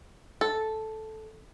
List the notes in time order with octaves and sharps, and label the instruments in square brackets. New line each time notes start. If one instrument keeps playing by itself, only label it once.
[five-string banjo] A4